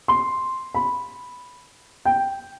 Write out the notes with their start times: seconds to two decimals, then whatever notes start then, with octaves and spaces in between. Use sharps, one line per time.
0.08 C6
0.75 B5
2.05 G5